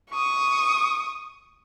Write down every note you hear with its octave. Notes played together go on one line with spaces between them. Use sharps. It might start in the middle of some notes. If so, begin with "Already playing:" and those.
C#6 D#6